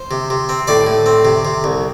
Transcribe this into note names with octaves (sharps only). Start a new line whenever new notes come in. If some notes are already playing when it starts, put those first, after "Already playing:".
Already playing: C5
C3
C3
C4
A2 D5
A2
C4
C3
C3
C2